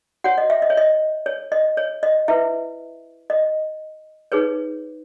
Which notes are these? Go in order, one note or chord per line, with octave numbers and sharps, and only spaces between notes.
F#4 C#5 F#5
D#5
E5
D#5
C#5
D#5
C#5
D#5
C#5
D#5
E4 B4 E5
D#5
D#4 G#4 B4 C#5